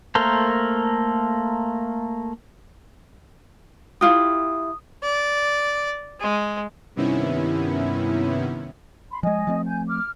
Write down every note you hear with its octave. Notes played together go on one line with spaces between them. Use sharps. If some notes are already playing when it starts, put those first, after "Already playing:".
A3 A#3 A4 A#4 C5
E4 F4 G4 D#6
D5
G#3
G2 C3 D#3 B3 C#4 E4
B5 C6
F3 G#3 D#5 G#5
F3 A3 C4
G#5 G6
D6 F6